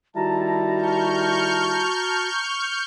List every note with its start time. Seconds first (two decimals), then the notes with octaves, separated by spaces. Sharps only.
0.16 D#3 G3 E4 F#4 A5 A#5
0.76 C#6 F6 G6